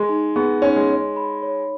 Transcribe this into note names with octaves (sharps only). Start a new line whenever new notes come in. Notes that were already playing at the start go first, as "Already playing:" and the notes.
Already playing: G#3 G#4
D#4
B3 G#4
C#4 D#4
G#3
C#5
B5
C#5